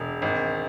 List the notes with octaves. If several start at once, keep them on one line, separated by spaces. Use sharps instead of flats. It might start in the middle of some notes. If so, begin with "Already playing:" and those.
Already playing: E1
G#1